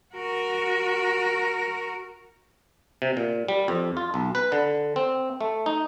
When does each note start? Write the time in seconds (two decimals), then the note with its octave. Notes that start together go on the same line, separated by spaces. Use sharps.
0.14 F#4 A#4
3.02 C3
3.17 A#2
3.48 G3
3.68 F2
3.97 F4
4.14 B1
4.35 B4
4.52 D3
4.96 C4
5.41 A3
5.66 D#4